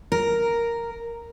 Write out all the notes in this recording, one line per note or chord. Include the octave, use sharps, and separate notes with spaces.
A#4